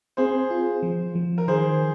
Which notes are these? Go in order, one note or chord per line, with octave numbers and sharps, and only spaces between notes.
C4 G#4 C5
F4
F3
F3
A#4
D#3 G#4 C5